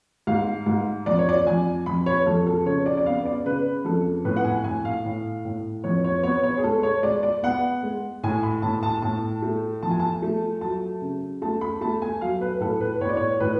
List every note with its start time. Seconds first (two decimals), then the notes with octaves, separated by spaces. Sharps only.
0.27 G#2 F5
0.66 G#2
1.06 F2 D5
1.19 C#5
1.29 D5
1.46 F2 G#5
1.86 F2 B5
2.06 C#5
2.26 F2 A4
2.47 A4
2.66 C#3 C#5
2.86 D5
2.97 D5
3.06 B3 F5
3.25 D5
3.45 C#3 B4
3.85 F2 A4
4.25 A2 B4
4.36 F#5
4.44 G#5
4.64 A2 G#5
4.85 F5
5.05 A2
5.45 A2
5.84 F2 C#5
6.04 C#5
6.23 B3 C#5
6.43 C#5
6.57 G#4
6.64 G#3 A4
6.83 C#5
7.03 G#3 D5
7.23 D5
7.43 B3 F#5
7.83 G#3
8.23 A2 G#5
8.43 B5
8.62 A2 A5
8.83 A5
9.02 A2 A5
9.42 A3
9.83 F3 A5
9.91 G#5
10.00 A5
10.22 A3
10.61 F#3 A5
11.02 C#3
11.42 A3 A5
11.61 B5
11.81 A3 A5
12.02 G#5
12.21 F#3 F5
12.41 B4
12.60 A2 A4
12.81 B4
13.01 A2 C#5
13.09 D5
13.17 C#5
13.40 A2 B4